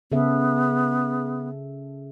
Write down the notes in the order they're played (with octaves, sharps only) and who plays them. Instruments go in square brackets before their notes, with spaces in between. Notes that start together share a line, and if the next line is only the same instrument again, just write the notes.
[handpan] C#3 A4 E5 [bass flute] B3